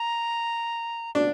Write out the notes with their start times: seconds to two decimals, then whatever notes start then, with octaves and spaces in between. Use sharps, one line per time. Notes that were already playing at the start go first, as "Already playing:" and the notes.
Already playing: A#5
1.15 D4